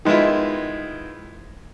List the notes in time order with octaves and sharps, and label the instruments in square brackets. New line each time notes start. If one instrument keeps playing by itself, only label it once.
[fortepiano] D#3 G#3 B3 E4 F4